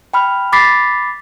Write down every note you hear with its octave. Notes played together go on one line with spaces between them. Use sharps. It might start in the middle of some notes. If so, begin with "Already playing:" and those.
G5 B5 F6
B5 D6 A6 B6 C7